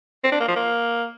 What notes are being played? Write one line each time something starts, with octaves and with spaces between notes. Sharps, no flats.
C4
D4
A#3
F3
A#3